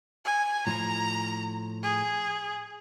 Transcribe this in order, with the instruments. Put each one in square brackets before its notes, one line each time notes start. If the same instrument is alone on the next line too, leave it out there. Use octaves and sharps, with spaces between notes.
[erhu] G#5
[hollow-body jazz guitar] A2 F3 [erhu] A#5
[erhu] G#4